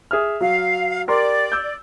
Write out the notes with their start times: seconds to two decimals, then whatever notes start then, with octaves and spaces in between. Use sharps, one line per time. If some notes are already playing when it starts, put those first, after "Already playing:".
0.11 G#4 E5 F6
0.41 F#3 F5
1.08 G4 A#4 D5 C6
1.52 E6 G6